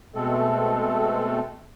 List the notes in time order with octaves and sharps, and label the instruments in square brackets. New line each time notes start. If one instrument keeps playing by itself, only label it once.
[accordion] B2 G#3 A3 C4 A4